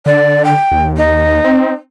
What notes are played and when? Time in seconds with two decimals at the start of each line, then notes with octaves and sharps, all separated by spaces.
0.06 D3 D5
0.45 G5
0.72 D#2
0.97 D#4
1.44 C4